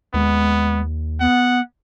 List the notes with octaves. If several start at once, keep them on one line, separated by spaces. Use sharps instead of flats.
D#2 G#3 B3
B3 F#5